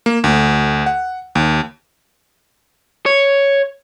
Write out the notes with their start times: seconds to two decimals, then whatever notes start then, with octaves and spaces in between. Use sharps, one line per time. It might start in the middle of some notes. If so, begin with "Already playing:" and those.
0.06 A#3
0.24 D2
0.86 F#5
1.35 D#2
3.06 C#5